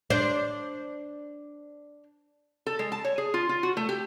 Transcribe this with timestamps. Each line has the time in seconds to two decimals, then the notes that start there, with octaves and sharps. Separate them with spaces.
0.10 D4 C5
2.67 A4
2.79 G#3
2.92 A5
3.04 C#5
3.18 G#4
3.34 F4
3.49 F4
3.63 F#4
3.77 A3
3.89 G4